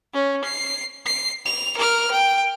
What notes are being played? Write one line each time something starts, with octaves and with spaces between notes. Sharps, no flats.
C#4
C7
C7
F7
A#4 F6
G5